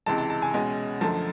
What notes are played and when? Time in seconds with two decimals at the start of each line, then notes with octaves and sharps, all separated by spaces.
0.06 C#2 C3 E3 G#3 A5
0.18 A5
0.30 A5
0.42 G#5
0.54 B2 G#3 C#4 G#5
1.01 F#2 D3 F3 A3 A5